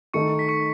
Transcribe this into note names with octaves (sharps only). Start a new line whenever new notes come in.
D#3 A3 D#4 C#6 C#7
B6
C#6 C#7